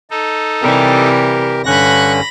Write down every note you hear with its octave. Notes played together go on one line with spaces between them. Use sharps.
D#4 A4
C3 E3 G3 G4 A#4
G2 D3 C#4 B5 C#6 F#6 A#6